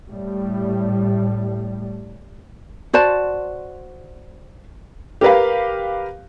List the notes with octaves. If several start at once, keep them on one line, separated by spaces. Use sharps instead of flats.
A2 G3
F#4 C5 D5 A5
G4 A#4 B4 F5